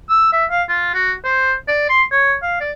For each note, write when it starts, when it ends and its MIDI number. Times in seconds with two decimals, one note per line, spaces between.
0.09 0.29 88
0.33 0.45 76
0.50 0.63 77
0.69 0.90 65
0.94 1.12 66
1.24 1.54 72
1.68 1.86 74
1.89 2.03 84
2.12 2.34 73
2.42 2.58 77
2.60 2.72 74